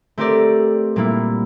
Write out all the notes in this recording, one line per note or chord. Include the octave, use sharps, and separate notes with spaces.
A3 C4 G4 A#4 D5
A#2 G3 A#3 E4